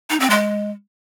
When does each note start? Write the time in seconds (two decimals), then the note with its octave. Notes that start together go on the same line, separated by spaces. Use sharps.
0.10 D#4
0.20 C4
0.30 G#3